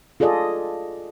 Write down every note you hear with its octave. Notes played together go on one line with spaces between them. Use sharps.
F4 G#4 A4 D5 D#5